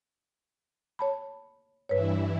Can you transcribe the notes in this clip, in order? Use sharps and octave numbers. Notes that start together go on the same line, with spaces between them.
C#5 A5 B5
G2 E3 E4 B4 C#5